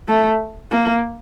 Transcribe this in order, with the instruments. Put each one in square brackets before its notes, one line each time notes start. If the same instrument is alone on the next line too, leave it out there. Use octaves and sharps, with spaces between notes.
[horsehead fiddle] A3
A#3